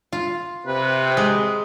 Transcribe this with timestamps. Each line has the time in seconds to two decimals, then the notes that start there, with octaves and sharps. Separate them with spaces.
0.13 F4
0.66 C3 B4
1.17 G#3